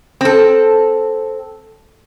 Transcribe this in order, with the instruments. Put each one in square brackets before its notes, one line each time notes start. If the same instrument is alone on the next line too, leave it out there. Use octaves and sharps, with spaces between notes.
[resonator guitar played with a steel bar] C4 A4